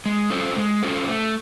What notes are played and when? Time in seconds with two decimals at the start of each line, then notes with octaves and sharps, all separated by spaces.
0.06 G#3
0.30 C#4 F4 A4 C5
0.56 G#3
0.83 C#4 F4 A4 C5
1.08 A3